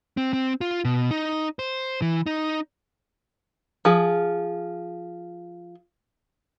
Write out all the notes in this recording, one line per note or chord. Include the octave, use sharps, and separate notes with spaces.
C4
C4
F4
B2
D#4
C5
E3
D#4
F3 G#4